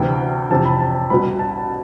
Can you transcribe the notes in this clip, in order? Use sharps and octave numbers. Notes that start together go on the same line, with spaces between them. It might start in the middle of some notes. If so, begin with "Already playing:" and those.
Already playing: D2 C3 E3 G5
F2 C3 E3 A5
B5
A5
A5
C2 B2 B5
A5